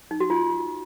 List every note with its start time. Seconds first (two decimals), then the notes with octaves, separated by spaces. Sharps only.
0.11 D#4
0.20 F#4
0.30 F4